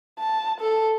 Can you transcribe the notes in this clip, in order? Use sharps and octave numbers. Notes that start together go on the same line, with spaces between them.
A5
A4